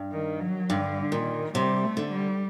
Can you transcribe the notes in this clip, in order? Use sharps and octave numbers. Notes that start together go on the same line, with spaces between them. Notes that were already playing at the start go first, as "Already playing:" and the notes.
Already playing: G2
D#3
F#3
G2 D3
A#2 D#3
C3 G3
A3
D3
G3